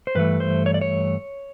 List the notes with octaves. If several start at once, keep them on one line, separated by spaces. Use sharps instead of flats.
C5
G2 E3 A3 B4
C5
C#5
D5
C#5